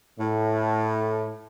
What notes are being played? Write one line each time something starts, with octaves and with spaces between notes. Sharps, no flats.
A2